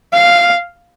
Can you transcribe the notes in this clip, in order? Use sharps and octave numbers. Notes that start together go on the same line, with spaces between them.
F5